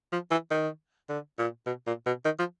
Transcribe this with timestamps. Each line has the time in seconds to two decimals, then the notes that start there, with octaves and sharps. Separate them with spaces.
0.12 F3
0.31 E3
0.51 D#3
1.09 D3
1.38 A#2
1.66 B2
1.87 A#2
2.06 B2
2.25 D#3
2.39 F3